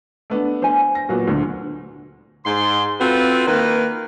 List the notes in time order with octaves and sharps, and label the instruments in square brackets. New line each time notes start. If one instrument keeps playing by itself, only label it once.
[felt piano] A3 B3 D4
[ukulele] C5 G#5
[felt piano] A#6
A#2 F#3 B3
D2 D3
[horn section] G#2 C6
C4 F4 F#4 A4 B4
D#3 A#3 B4